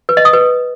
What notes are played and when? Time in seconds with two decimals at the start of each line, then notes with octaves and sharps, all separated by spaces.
0.09 B4
0.17 D#5
0.25 D#6
0.33 B4